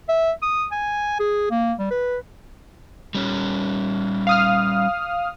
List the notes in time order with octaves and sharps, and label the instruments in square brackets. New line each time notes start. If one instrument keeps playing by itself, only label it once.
[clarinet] E5
D#6
G#5
G#4
A#3
G3
B4
[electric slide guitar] G3 C#4
[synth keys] F5 D#6 F6